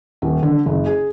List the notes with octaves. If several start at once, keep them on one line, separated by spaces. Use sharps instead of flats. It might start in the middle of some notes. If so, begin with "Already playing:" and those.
D#1
D3
F#1
G#4